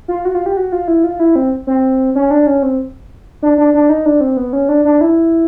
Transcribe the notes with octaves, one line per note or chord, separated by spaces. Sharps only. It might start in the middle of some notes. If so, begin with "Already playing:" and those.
F4
F#4
F4
G4
F#4
F4
E4
F4
E4
C4
C4
C#4
D4
C#4
C4
D4
D4
D4
D#4
D4
C4
B3
C#4
D4
D4
E4